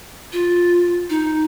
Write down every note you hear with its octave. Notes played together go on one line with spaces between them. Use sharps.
F4
D#4